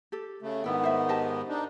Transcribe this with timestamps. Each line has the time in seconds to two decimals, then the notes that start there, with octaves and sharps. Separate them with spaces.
0.12 G4 A4
0.42 C#3 A3
0.64 G#2 D#3 B3 D4 E4 G5
0.83 C5 E5
1.09 G4 D#5 A5
1.49 D4 D#4